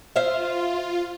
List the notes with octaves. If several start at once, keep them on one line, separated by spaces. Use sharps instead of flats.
F4 C5 E5 F5